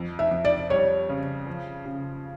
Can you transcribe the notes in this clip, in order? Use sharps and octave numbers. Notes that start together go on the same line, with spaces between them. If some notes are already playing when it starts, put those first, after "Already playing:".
Already playing: F2
E5
F2
D5
G3 C#5
C#3
F3
C#3